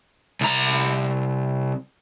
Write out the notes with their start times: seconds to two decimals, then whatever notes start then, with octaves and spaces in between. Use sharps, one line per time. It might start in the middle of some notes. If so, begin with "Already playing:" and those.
0.41 C2 A#5